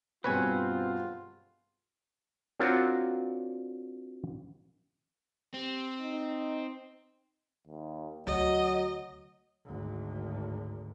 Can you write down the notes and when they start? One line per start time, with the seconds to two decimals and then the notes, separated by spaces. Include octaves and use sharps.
0.24 G2 B2 C4 F4 B4 C#5 G#5
2.59 C4 D4 F4 F#4 A#4 C#5
5.54 C4 G4
6.00 D#4
7.67 D#2
8.27 D2 F#3 D#5
9.65 G#1 D2